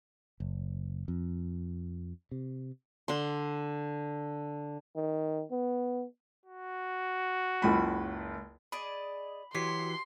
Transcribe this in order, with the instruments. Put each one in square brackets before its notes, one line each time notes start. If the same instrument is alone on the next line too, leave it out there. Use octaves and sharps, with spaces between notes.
[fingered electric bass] F#1
F2
C3
[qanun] D3 C6
[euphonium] D#3
B3
[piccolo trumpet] F#4
[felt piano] F#1 C#2 B5
[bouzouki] G#4 D5 D#5 [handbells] B5
[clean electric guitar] E3 [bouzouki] F#3 [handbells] G4 B6 C7 [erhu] C6